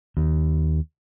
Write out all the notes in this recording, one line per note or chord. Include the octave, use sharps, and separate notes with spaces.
D#2